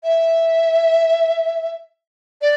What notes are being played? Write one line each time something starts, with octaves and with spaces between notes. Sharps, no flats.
E5
D5